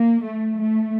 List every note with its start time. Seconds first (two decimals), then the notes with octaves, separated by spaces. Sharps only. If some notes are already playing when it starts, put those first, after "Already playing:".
Already playing: A#3
0.25 A3
0.59 A3